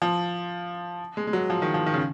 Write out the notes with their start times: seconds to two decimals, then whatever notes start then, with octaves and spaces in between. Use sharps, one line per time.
0.02 F3
1.17 G#3
1.27 G#3
1.33 F#3
1.50 F3
1.62 D#3
1.74 F3
1.86 D#3
1.94 C#3